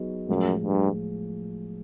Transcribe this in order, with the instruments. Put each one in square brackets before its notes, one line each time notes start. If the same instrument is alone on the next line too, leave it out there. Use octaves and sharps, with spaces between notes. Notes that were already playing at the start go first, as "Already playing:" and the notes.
Already playing: [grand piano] F#3 B3 D#4 G#4
[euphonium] F#2 [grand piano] A2 F3 G#3
[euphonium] G2